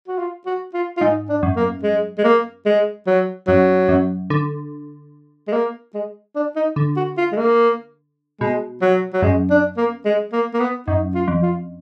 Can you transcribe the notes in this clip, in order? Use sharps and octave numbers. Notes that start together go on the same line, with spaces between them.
F#4
F4
F#4
F4
F4
G#2 D#4
D4
F#2
A#3
G#3
G#3
A#3
G#3
F#3
F#2 F#3
F#2
D3
G#3
A#3
G#3
D4
D#4
D3
F#4
F4
G#3
A#3
B2 G#3
F#3
F#3
F#2 G#3
D4
A#3
G#3
A#3
A#3
B3
F#2 D#4
F4
F2
F4